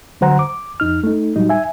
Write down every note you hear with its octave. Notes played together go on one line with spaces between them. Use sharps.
D3 F#3 C5 F#5 A#5
D6
F2 D#4 F6
A3 D#4
A2 F#3 G3 D#4
E5 G#5